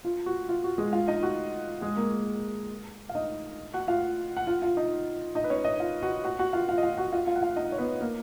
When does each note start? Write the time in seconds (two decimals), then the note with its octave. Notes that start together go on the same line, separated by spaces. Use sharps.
0.05 F4
0.26 F#4
0.49 F4
0.64 F#4
0.78 G#3 G#4
0.93 F4 F5
1.08 D#4 D#5
1.23 F#4 F#5
1.81 G#3 G#4
1.96 A#3 A#4
3.09 F5
3.15 D#4 D#5
3.73 F#4 F#5
3.88 F4 F5
4.37 F#5
4.47 F4 F5
4.62 F4 F5
4.77 D#4 D#5
5.35 D#4 D#5
5.44 B4
5.50 C#4 C#5
5.65 D#4 D#5
5.80 F4 F5
6.02 F#4 F#5
6.24 F#4 F#5
6.39 F#4 F#5
6.53 F4 F5
6.69 F4 F5
6.78 D#5
6.83 F4 F5
6.98 F#4 F#5
7.12 F4 F5
7.27 F4 F5
7.36 F#5
7.42 F4 F5
7.56 D#4 D#5
7.72 C#5
7.78 B3 B4
8.01 A#3 A#4